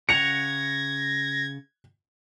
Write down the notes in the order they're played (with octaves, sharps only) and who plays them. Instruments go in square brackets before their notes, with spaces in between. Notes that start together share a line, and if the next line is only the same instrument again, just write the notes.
[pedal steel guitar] C#3 C#5 F#5 [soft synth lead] G#6 [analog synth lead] A#6 [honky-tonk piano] C#7 F7